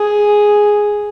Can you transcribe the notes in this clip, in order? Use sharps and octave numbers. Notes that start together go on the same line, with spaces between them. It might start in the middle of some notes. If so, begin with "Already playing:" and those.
Already playing: G#4